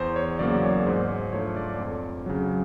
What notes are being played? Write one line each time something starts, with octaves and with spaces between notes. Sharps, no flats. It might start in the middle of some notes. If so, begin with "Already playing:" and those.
Already playing: E2 C5
C#5
C#3 F#3 A#3 D5
C#5
G#2 C5
C#5
F3 A3 D4 C#5
D5
F2 C#5
C#3 F#3